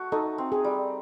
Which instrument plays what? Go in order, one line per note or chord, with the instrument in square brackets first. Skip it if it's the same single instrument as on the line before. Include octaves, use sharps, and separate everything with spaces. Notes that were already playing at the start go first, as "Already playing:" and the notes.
Already playing: [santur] A3 F#4
[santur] D#4 [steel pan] A4
[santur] C4
[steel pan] G#4
[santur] G3